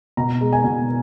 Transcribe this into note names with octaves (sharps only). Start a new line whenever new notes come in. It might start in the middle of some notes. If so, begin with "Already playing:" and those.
B2 A#5
G#3
G#5
B2